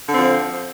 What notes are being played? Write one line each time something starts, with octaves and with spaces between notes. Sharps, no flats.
D3 F3 C4